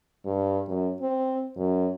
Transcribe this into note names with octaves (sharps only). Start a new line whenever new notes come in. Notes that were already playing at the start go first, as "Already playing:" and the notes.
G2
F#2
C4
F#2